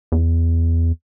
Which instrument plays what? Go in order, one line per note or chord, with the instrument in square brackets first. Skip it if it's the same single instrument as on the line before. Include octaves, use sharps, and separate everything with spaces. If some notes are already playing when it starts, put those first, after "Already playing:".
[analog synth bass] E2